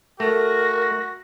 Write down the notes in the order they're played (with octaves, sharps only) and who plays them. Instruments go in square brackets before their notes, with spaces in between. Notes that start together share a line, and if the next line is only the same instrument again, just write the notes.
[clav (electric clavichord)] A3 [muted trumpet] F#4 [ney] A#4 [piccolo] A#6